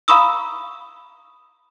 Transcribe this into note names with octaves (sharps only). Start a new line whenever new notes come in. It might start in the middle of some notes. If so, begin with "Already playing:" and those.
F5 A#5 B5 C#6 D#6 E6